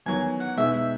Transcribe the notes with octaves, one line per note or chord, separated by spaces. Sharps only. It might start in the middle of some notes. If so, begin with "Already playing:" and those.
E2 D#3 F#3 G#5
F#5
B2 G#3 D#4 G#4 E5
E5